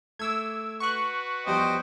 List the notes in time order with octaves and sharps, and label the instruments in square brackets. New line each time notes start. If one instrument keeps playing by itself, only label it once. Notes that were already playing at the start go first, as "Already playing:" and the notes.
[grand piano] A3 [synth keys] D6 E6 G#6
[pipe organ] F#4 B4 [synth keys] C#6 F#6
[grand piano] E2 F3 G3 [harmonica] C5 D#5 G5